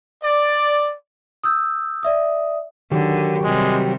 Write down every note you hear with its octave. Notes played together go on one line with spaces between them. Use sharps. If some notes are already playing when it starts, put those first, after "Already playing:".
D5
D#6 E6 G6
D5 E5 D#6
D3 D#3 F#3 G4
C3 G3 G#3